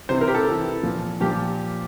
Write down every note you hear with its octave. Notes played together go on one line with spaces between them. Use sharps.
C3 E3 C5
A#4
G4
A4
C3 E3
A#2 F3
A#2 F3 G4